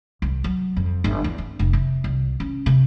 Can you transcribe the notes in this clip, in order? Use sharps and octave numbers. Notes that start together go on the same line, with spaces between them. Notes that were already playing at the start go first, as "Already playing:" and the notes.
C2
F#3
F2
G1
E2
C4
F1
C3
C2
C#4
C3